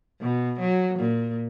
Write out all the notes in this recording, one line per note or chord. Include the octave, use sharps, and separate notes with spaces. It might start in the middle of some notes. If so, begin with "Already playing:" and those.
B2
F#3
A#2